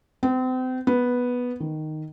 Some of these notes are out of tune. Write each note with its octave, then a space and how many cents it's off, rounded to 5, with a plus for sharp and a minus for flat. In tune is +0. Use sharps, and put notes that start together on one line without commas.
C4 -35
B3 -5
D#3 -5